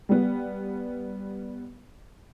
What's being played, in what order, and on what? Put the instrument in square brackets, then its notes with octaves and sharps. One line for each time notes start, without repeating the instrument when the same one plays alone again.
[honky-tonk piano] G3 B3